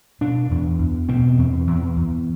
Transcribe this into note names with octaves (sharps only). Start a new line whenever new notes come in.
B2 D4
E2
E2
B2 C4
E2
E2
E2